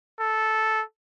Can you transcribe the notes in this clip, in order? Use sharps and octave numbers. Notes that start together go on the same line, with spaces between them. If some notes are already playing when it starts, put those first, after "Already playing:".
A4